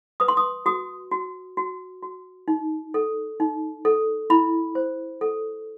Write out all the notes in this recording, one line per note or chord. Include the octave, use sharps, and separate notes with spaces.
B4 D#6
C6
D#6
F#4 D#6
F#4
F#4
F#4
D#4
A4
D#4
A4
E4 B5
C5
A4